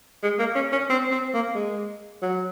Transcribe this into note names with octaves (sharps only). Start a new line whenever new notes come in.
G#3
A#3
C#4
C#4
C4
C4
A#3
G#3
F#3